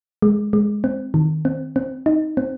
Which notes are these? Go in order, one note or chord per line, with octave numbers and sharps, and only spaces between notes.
G#3
G#3
C4
D#3
C4
C4
D#4
C4